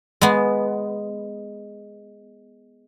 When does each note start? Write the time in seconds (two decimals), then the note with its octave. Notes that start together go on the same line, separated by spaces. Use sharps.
0.21 G#3 B3